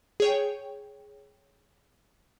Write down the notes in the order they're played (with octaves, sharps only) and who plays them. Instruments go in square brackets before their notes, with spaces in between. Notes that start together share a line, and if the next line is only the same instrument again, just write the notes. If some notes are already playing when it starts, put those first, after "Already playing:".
[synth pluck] G#4 C#5 G5